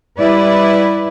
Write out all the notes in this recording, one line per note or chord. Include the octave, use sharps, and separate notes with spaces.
G3 E4 B4 D5